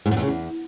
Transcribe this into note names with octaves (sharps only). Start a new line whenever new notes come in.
G#2
F#2
E2
C#3
E2